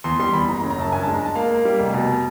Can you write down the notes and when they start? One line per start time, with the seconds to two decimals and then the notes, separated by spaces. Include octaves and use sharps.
0.04 E2 C6
0.20 G3 C6
0.33 E2 B5
0.48 F#1 A#5
0.59 A#5
0.63 C#3
0.71 A#5
0.78 F#2 A5
0.92 G2 G#5
1.03 A5
1.07 G#3
1.14 A#5
1.21 G#3 A5
1.36 A#3 F5
1.51 A#3
1.65 G3
1.80 F1
1.94 B2